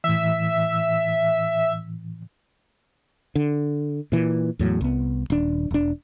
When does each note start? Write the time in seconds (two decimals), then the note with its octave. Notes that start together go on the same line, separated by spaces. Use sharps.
0.04 A2 E3 E5
3.36 D3
4.12 A#2 E3
4.59 E2 A2 F#3
4.81 C2 B3
5.30 D#1 D4
5.71 E1 D4